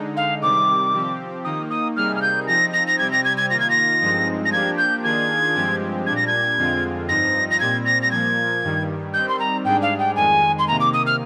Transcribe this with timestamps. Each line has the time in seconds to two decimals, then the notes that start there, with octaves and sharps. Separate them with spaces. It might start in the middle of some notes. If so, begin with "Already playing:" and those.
Already playing: D3 G#3 D#4
0.16 F5
0.42 C3 D#3 G3 D6
0.93 F3 C4 G4
1.44 D#3 A#3 D#4 D#6
1.70 D#6
1.96 C3 G3 A#3 D#4 G#4 F6
2.16 F6
2.22 G6
2.47 F3 C4 D#4 A#6
2.73 A#6
2.87 A#6
2.98 C3 G3 C4 G4 G#6
3.12 A#6
3.24 G#6
3.37 G#6
3.50 D#3 A#3 F4 A#6
3.59 G#6
3.70 A#6
4.01 G2 F3 G#3 C4 D#4
4.45 A#6
4.52 F3 A#3 D4 G4 G#6
4.78 G6
5.03 D#3 A#3 D4 F4 G#4 G#6
5.55 G2 F3 G#3 C4 G4
6.06 A#2 G3 D4 G#6
6.16 A#6
6.27 G#6
6.57 F2 D3 G#3 C4 F4
7.08 G2 F3 C4 D#4 A#6
7.50 A#6
7.60 A#2 G3 C4 G#6
7.85 A#6
8.02 A#6
8.11 A#2 F3 A#3 G#6
8.63 G2 D#3 G3
9.13 D#3 G3 C4 G6
9.28 C6
9.39 A#5
9.64 G#2 G3 D4 G#4 G5
9.82 F5
9.99 G5
10.16 F2 D#3 G#3 G#5
10.58 C6
10.67 C3 D#3 A#3 A#5
10.80 D6
10.93 D#6
11.06 F6